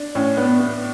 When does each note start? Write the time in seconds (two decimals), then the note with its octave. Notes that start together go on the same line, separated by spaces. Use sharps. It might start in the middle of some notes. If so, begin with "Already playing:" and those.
Already playing: D4
0.15 A2 C#4
0.37 B3 D4
0.60 B3